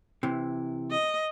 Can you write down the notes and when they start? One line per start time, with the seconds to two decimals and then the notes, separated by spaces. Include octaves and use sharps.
0.23 C3 E3
0.91 D#5